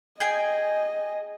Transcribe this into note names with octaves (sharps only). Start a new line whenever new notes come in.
G#4 D#5 G5 G#5